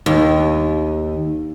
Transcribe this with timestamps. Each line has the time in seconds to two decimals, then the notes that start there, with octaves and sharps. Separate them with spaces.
0.06 D#2